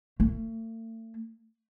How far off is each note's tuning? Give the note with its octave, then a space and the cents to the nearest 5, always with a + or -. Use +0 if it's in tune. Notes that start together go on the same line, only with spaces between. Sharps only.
A3 +40